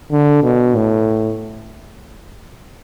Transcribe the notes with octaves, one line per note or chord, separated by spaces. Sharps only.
D3
B2
A2